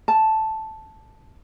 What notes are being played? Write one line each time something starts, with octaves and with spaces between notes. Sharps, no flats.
A5